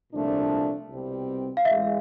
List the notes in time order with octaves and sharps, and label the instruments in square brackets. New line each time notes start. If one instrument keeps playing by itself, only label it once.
[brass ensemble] C2 A#2 F3 A3 D4
C2 B2 G3 C4
[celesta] F5
[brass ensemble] A1 A2 E3 G#3 [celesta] E5